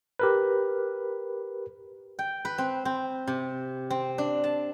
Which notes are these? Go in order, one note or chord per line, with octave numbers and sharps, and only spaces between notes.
G4 A#4 B4
G5
B4
C4
C4
C3
C4
D4
A5